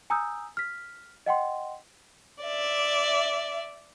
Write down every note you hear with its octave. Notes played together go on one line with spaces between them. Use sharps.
G#5 A#5 D#6 E6 G6
F6 B6
D#5 F#5 G5 C6
D5 E5